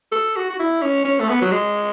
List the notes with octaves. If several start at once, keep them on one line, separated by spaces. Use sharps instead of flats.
A4
F#4
F#4
E4
C#4
C#4
A3
B3
F#3
G#3